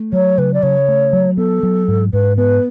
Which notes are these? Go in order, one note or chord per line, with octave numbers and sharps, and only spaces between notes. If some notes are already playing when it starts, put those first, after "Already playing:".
Already playing: A3
F#3 C#5
C#3 B4
D5
C#3 C#5
A3
F#3
B3 A4
F#3
G#2
G#2 B4
B3 B4